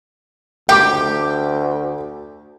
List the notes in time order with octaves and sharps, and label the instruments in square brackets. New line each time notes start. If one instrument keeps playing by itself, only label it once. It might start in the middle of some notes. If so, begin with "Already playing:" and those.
[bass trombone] D2 [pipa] G4 [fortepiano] G5 D6